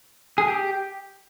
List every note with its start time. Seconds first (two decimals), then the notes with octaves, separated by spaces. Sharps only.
0.38 G#4
0.48 G4